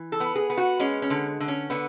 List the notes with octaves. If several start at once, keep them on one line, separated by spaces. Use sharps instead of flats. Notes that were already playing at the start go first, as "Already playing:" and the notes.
Already playing: E3
A4
B3
G#4
B3
F#4
G#3 C#4
C#4
D3
D3
C#4
D3 B3